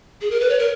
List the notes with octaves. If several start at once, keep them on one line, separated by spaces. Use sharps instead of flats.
G#4
A#4
B4
C#5
A#4